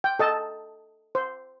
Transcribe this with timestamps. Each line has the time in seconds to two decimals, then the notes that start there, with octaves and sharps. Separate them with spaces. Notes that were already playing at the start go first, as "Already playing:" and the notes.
0.04 G5
0.19 A4 D#5 A5
1.15 C5